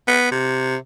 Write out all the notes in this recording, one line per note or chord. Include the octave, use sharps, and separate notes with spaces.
B3
C3